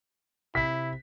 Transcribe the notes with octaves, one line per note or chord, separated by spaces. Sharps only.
C3 E4 B6